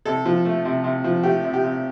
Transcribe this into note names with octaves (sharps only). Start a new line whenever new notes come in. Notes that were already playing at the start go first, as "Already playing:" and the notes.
C3 A4
F3
A3
C3
C3
F3
A3 G4
C3
G4
C3